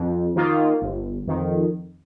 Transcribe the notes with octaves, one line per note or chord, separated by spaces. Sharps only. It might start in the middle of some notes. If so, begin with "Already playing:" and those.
Already playing: F2
D#3 A#3 F4
G1
F2 D#3